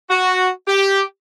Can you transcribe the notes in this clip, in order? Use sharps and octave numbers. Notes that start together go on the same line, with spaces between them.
F#4
G4